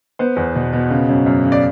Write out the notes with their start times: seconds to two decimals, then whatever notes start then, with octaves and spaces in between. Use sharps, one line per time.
0.19 B3 C5
0.36 E2
0.55 B2
0.73 B2
0.90 C#3
1.09 F#2
1.26 F#2
1.44 C#3
1.52 D5